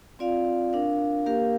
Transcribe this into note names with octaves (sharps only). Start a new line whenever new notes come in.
C4 F4 D5 F5
D4 A#4 F5
A#3 G4 A#4 F5